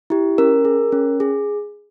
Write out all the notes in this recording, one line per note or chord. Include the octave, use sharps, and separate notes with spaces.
E4 G4
C#4 A#4
G#4
C#4
G#4